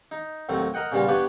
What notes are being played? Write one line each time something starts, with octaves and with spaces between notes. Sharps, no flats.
D#4
D#2 A2 F#3 C4
A#4 D#5 F#5 G5
A#2 C#3 G3 B3 F4
B3 D4 G4 B4 C#5 D5